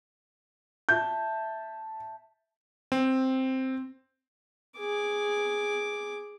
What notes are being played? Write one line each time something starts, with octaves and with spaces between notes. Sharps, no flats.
E5 A5 G6
C4
G#4 D6